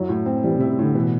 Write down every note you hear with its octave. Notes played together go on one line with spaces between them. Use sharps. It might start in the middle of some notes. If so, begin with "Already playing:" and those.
Already playing: F#2 F#3 E4
A2
C4
E3 G3
C3 E4
C3
A2 D3
B2 E3